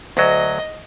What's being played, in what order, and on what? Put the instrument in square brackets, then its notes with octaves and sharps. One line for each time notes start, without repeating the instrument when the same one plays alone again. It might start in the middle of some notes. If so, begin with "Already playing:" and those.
[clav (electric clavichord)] D2 F#3 [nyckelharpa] D#5